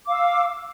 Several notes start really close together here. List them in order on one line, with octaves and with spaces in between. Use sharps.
D6 F5 E6